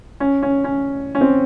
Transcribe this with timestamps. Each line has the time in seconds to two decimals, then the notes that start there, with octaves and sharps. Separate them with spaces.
0.20 C#4
0.43 C#4
0.64 C#4
1.15 C#4
1.21 C4